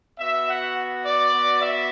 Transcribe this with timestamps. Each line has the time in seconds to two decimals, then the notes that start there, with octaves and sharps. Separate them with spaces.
0.18 B3 F#4 E5
0.47 F#5
1.04 D5
1.33 B3 F#4
1.61 E5